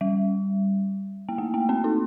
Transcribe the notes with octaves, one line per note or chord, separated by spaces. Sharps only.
G3
A#3
A3
A#3
C4
D#4